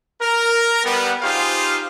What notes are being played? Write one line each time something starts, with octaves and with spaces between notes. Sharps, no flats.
A#4
G3 B3
D#4 F4 G4 G#4 C5 F5